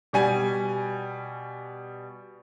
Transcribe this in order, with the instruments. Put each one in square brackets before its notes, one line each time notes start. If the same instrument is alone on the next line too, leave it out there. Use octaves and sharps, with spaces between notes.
[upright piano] B2 G3 G#5